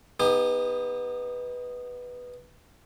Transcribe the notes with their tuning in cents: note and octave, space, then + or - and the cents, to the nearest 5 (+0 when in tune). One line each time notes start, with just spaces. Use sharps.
B3 +0 D#4 +5 G4 +40